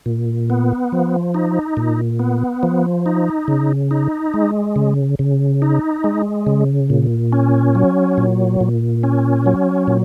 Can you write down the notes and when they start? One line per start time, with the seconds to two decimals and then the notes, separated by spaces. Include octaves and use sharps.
0.06 A#2
0.50 B3
0.92 F3
1.34 D#4
1.77 A#2
2.19 B3
2.63 F3
3.06 D#4
3.48 C#3
3.91 D#4
4.34 G#3
4.76 C#3
5.19 C#3
5.62 D#4
6.04 G#3
6.46 C#3
6.90 A#2
7.32 C#4
7.75 F#3
8.18 A#2
8.60 A#2
9.03 C#4
9.46 F#3
9.88 A#2